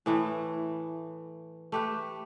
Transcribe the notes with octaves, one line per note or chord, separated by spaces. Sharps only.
A2 E3 A3
A3 G4 B4